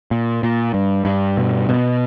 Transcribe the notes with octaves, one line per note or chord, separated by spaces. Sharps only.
A#2
A#2
G2
G2
B2
B2